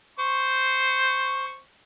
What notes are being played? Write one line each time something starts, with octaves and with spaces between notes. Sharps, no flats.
C5 C#6